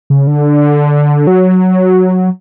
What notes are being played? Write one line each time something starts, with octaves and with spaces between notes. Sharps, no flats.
C#3
D3
F#3